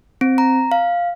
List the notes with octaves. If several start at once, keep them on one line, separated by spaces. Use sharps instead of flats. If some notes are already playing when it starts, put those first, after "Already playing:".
C4
A#5
F5